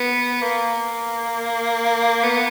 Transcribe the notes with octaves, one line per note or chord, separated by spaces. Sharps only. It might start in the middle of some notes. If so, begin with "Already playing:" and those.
Already playing: B3
A#3
B3